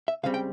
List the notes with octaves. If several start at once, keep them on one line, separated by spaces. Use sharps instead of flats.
E5
C#2 C#3 G3 C4 F5
G5